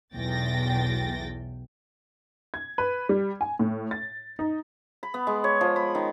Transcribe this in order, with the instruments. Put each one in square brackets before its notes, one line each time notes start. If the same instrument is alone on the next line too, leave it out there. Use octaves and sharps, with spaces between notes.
[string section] B1 E2 G5 A6 A#6
[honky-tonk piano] G#6
B4
G3
G#5
A2
A6
D#4
[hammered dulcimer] B5
B3
G#3
C#5
F3
B5
D#3